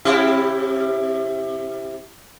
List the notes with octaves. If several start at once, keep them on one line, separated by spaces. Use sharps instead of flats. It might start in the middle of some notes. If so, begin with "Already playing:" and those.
C3 E4 G4